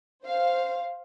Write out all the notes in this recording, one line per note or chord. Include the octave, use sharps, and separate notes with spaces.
C5 F5